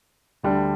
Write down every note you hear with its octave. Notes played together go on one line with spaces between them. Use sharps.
D2 D3 G3 D4